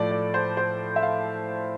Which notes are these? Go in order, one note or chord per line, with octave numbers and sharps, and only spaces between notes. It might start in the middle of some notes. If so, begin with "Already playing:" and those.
Already playing: A2 F3 A3 A4 D5
D5
C5
C5
E5
F5